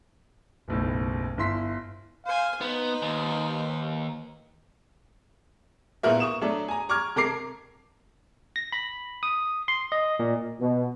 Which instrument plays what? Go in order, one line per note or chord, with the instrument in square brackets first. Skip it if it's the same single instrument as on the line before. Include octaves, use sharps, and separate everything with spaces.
[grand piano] F#1 B1 A2
G1 E4 C6 B6
[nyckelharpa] C5 G#5 [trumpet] F5
[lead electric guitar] B3 [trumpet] D#4 [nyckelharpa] B4 C5
[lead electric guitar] D#2
[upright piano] A#2 B3 E4 F#4 A#4 E5
C#6 D#6 E7
F#3 A3 D4 A4
G#5 A#5
A#5 C#6 D6 F6 G#6
C3 A4 A#4 A#5 D6 C7
[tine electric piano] A#6
B5
D#6
C6
D#5
A#2
[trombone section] B2